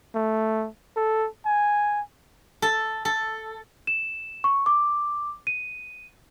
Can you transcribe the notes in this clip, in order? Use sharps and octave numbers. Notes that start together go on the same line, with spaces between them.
A3
A4
G#5
A4
A4
E7
C#6
D6
D#7